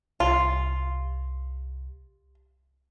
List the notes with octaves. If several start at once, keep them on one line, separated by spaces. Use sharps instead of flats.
C2 F4